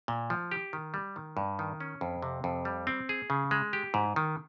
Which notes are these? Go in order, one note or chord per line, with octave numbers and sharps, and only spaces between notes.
A#2
F3
G4
D#3
G3
D#3
G2
D#3
C#4
F2
C3
F2
G3
C4
G#4
C#3
G#3
G4
G#2
D#3